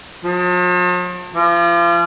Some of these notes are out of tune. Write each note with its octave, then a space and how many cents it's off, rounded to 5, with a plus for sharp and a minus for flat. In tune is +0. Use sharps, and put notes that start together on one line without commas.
F3 +45
F3 -35